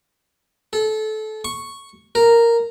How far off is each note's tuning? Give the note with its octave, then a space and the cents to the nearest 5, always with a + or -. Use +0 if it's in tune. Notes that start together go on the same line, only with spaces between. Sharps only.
A4 -25
C#6 -5
A#4 -5